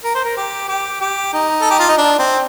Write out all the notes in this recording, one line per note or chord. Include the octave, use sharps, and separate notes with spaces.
A#4
C5
A#4
G4
G4
G4
D#4
A4
G4
F4
D#4
D4
C4